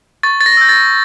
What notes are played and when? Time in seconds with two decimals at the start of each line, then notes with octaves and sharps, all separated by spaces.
0.23 C#6 A6
0.41 A6
0.46 A#6
0.57 E6 G6
0.69 A6